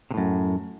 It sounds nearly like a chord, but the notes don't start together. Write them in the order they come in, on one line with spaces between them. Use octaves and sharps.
C3 A2 F#2